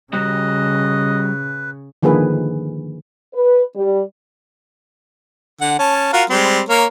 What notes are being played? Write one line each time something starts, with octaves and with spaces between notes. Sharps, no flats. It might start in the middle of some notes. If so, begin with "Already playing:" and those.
C#3 G3 F#4 G4 B4 D#5
D3 D#3 F3 A#3 G#4 B4
B4
G3
D3 F#5
C#4 A5
F4 F#4 A#4
G3 G#3 C4
A#3 A#4 C#5